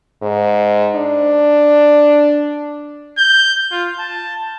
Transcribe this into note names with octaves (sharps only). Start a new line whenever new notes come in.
G#2
D4
G6
F4
A5